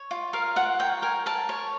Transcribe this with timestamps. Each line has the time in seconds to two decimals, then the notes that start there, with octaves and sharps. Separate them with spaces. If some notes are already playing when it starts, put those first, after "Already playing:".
Already playing: C#5
0.11 F4
0.33 A#4 F5
0.56 F4 F#5
0.79 C#5 G5
1.02 A#4 G#5
1.26 A#4 A5
1.49 C#5